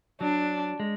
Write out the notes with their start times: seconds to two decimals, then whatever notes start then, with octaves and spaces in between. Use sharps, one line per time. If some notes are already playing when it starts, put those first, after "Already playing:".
0.21 F#3 D4
0.80 G#3